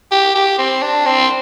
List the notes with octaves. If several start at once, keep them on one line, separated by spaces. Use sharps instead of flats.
G4
G4
C4
D4
C4